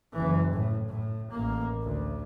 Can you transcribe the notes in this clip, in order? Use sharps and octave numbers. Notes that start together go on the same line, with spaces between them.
F#1 E3
A2
A2
A1 A#3
D2